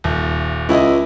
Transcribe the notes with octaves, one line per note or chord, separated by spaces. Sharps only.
D#1
C#2 E4 D#5